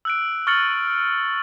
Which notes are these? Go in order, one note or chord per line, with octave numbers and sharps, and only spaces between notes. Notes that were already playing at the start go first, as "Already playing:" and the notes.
E6 F#6 D7
C#6 F6 A6 C#7 F#7